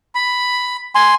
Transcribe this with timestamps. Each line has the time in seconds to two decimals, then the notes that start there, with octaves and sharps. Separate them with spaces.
0.15 B5
0.95 G#5 C6